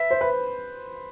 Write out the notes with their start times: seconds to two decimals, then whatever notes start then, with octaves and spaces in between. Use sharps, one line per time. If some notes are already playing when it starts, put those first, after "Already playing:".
Already playing: B4 E5
0.11 C5
0.21 B4